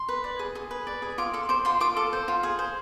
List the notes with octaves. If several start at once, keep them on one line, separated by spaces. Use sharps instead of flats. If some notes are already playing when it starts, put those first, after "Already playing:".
Already playing: C6
B4
D5
G#4
G#4
B4
D5
G#4
F4 D6
A4 C6
C5 D6
F4 C6
F4 D6
A4
C5
F4
G#4
C5